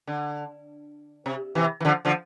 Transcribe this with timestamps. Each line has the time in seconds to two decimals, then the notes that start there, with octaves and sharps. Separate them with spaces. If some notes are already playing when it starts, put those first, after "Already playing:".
0.07 D3
1.26 C3
1.55 C3 E3
1.80 E3
1.85 D3 F3
2.05 D3 F3